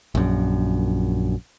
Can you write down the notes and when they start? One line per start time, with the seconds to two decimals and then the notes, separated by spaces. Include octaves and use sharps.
0.15 A#1 F#2